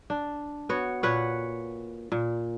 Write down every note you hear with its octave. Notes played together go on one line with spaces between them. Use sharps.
D4
B3 F#4 C#5
A#2 B4 C#5 F#5
A#2